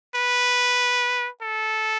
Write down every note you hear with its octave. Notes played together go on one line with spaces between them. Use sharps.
B4
A4